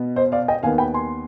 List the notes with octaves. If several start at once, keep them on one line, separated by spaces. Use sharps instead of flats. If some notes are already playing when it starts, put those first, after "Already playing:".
Already playing: B2 B3
C5 D#5
D5 F5
D#5 G5
D#2 D#3 B3 F5 G#5
G5 B5
G#5 C6